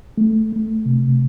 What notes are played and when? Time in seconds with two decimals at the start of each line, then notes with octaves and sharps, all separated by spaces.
0.18 A3
0.52 A3
0.86 C3